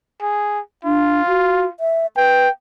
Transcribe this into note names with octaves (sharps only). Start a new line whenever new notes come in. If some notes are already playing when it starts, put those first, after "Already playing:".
G#4
D4 F4
F#4
E5
B4 G5